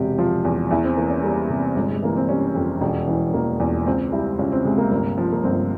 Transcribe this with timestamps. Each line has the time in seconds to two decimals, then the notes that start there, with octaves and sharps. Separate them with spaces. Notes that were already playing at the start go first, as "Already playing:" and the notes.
Already playing: E1 C3 G4
0.18 F3 F4
0.45 E2
0.71 E2 E4
0.84 C4
0.97 E3 A#3
1.10 C#4
1.23 G3 A#3
1.50 C3
1.76 G1 G#3
1.92 G#3
2.02 E3 A#3
2.17 C4
2.29 G3 C#4
2.55 F2
2.81 E1
3.07 E3
3.34 E1 A#3
3.60 E2
3.86 C#2 C4
4.12 G3 E4
4.39 C#2 C#4
4.52 C4
4.65 C3 G#3
4.78 A#3
4.91 G1 A#3
5.18 F3
5.32 A#3
5.44 G1 C4